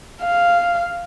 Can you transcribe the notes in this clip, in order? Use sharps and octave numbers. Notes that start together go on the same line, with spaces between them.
F5